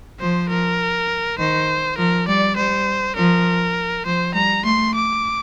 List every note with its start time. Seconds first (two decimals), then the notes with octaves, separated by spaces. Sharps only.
0.20 F3 C5
0.49 A#4
1.39 D#3 C5
1.98 F3 A#4
2.28 G3 D5
2.57 G3 C5
3.16 F3 A#4
4.06 F3 C5
4.35 G3 A#5
4.64 A3 C6
4.95 D6